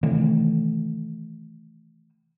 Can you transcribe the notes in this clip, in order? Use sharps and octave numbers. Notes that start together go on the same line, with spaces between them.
C3 D#3 E3 A3